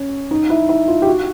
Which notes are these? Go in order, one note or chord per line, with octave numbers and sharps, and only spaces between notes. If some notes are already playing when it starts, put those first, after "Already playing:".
Already playing: C#4
D#4
E4
E4
F4
G4
F#4